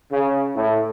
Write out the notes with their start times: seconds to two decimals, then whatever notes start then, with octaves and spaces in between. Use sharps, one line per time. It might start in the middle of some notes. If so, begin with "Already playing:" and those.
0.12 C#3
0.56 A2